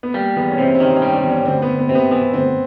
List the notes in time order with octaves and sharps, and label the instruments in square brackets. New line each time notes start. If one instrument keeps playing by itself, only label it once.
[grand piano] B3
[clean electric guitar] G3 [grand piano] A#3
[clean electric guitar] E2 [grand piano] B3
[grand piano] C#4
[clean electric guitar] C3 [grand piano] C4
[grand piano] C4
[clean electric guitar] D#3 [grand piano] C#4
[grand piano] C#4
[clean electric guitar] G3
[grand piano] D4
[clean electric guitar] E2
[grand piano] C#4
[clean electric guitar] D2 [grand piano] C4
[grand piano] B3
[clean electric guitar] D2
[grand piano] B3
[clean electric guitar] C3 [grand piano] C4
[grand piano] B3
[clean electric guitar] E3 [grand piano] B3
[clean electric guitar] D2 [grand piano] C4